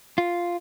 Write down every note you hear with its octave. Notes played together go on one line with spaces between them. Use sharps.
F4